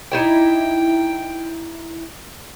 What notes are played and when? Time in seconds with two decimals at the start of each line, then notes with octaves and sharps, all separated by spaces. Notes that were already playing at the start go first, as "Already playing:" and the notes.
0.12 D#4 E4 D5 G5